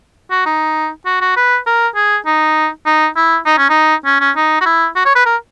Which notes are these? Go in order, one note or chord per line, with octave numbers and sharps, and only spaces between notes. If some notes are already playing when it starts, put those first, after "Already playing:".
F#4
D#4
F#4
F#4
B4
A#4
G#4
D#4
D#4
E4
D#4
C#4
D#4
C#4
C#4
D#4
F#4
E4
F#4
C#5
B4
A#4